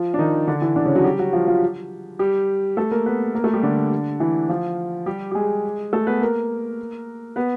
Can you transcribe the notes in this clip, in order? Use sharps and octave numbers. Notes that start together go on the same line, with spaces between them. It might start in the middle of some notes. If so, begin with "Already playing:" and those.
Already playing: F3 F4
D4
D#3 D#4
D3 D4
E3 E4
D3 D4
C#3 C#4
F#3 F#4
G3 G4
F#3 F#4
F3 F4
F3 F4
G3 G4
A3 A4
A#3 A#4
B3 B4
A#3 A#4
A3 A4
G3 G4
D3 D4
E3 E4
F3 F4
G3 G4
G4
G#3 G#4
A3 A4
B3 B4
A#3 A#4
B3 B4